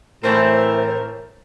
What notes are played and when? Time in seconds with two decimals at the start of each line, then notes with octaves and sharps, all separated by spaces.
0.24 A2 E3 A3 C4 A#4 C5